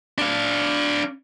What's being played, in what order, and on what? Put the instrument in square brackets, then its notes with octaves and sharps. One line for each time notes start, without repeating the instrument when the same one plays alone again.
[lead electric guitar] D4 F5